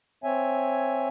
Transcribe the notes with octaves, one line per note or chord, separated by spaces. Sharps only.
C4 C#5 E5 G#5